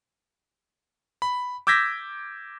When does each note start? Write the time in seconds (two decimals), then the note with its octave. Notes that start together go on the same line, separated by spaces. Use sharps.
1.22 B5
1.67 D6 E6 G6 G#6 A#6 B6